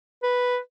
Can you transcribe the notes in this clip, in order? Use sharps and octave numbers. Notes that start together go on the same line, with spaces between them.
B4